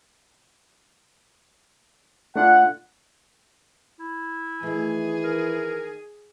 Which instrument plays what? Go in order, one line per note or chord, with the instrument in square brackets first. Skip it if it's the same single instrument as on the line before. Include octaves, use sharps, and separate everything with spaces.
[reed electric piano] A3 D4 F4 [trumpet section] F#5
[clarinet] E4
[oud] D#3 A3 [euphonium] E3 [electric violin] G#4
[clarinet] A#4